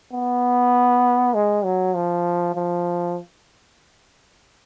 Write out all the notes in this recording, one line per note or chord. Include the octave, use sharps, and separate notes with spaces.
B3
G#3
F#3
F3
F3